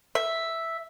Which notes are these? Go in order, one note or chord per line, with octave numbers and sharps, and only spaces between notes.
E5